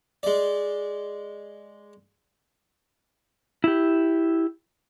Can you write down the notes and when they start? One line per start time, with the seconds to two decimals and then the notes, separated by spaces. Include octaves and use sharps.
0.23 G#3 D5
3.64 E4 G4